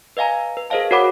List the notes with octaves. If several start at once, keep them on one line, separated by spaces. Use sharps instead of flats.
B4 D#5 F5 G#5 A#5
B4
G#4 A#4 C5 D#5 F5 A5
F#4 A#4 C#5 F#5 B5 D6